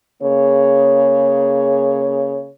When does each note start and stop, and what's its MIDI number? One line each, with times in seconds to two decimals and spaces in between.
0.23 2.49 49
0.23 2.49 58
0.23 2.49 68
0.23 2.49 73